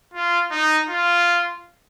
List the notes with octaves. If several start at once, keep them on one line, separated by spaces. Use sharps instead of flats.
F4
D#4
F4